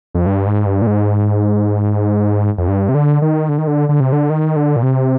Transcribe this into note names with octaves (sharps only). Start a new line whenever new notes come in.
F2
G2
G#2
G2
A#2
G#2
F2
G2
C3
D3
D#3
D3
D#3
D3
D3
C3
D3
D#3
D3
A#2
C3